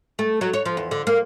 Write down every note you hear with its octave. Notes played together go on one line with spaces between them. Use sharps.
A3
F#3
C#5
F3
E2
D3
A#3